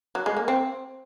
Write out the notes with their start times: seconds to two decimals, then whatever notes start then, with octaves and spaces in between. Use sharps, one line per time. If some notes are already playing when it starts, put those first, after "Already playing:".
0.15 F#3
0.26 G#3
0.37 A#3
0.48 C4